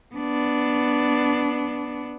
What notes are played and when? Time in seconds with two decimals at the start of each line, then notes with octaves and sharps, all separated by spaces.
0.15 B3 D4